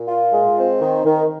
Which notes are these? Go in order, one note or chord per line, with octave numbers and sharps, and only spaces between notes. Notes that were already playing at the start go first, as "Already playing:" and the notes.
Already playing: A#2
F4
G#3
C4
D#3
D#3